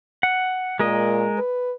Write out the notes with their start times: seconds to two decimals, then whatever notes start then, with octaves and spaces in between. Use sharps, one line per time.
0.23 F#5
0.79 A#2 G#3 A#4 D#5
1.38 B4